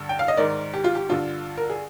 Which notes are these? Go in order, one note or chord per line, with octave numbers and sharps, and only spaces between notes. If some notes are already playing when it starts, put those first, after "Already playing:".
Already playing: G2 D3
G5
F5
D#5
G#2 D#3 A#4 D5
G4
F4
G4
G2 D3 F4
A#4
G#4